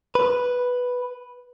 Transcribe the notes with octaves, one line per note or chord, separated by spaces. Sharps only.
B4